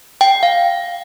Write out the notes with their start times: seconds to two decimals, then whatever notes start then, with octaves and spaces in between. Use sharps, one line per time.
0.21 G5
0.43 F5